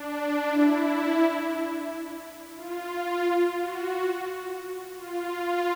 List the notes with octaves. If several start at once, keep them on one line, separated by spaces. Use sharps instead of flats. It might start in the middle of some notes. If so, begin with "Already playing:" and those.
Already playing: D4
E4
F4
F#4
F4